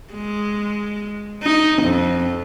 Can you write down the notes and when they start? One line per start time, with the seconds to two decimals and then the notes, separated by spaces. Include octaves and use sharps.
0.14 G#3
1.43 D#4
1.83 F2